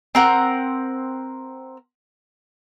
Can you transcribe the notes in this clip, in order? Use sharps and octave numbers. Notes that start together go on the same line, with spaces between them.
C4 A#4 F#5